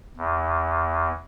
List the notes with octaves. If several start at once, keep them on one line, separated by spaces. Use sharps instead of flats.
E2